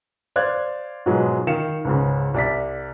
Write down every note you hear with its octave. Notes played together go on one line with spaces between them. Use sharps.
C5 D5 F5 F#6 G#6
G#2 B2 F3 F#3 G#3
D#3 F5 C#7 E7
C#2 G#2 C#3
C2 D5 B6